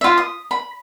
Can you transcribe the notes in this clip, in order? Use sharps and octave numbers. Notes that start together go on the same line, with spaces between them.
F4 E5
D#6
B5